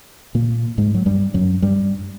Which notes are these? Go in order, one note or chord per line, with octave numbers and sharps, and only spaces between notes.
A#2 A#3
G#2 G#3
F#3
G2 G3
F#2 F#3
G2 G3